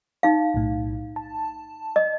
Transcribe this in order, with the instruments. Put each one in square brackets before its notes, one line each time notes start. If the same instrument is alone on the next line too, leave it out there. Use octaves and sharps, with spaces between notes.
[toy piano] D#4 F5
[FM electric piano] B1 A2
A5
[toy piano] D#5